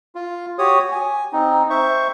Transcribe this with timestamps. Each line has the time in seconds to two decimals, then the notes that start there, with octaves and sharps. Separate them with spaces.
0.15 F4
0.58 F#4 G4 C#5 D#6
0.92 G#5
1.33 C4 D#4
1.70 C5 E5 C#6